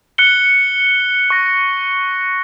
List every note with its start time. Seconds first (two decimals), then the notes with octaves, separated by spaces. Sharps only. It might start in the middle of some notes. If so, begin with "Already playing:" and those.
0.18 F#6 C#7 G7
1.30 C#6 A#6